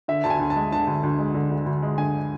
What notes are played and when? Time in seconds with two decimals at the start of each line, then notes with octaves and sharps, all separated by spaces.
0.08 D3 E5
0.24 D2 A5
0.30 G#5
0.40 D2
0.50 A5
0.56 G#3
0.72 D3 A5
0.87 D2
1.03 D2
1.19 G#3
1.34 D3
1.50 D2
1.66 D2
1.83 G#3
1.98 D3 G#5